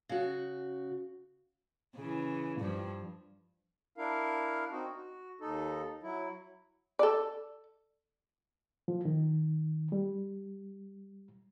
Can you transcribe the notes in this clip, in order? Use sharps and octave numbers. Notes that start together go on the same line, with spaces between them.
C#3 F#4
C#3 E3
G2 F3
D4 E4 A#4 F5
C4 D#4 F#4
F#4
D#2 D#4 A4
F#3 E4
A4 D5
F3
D#3
G3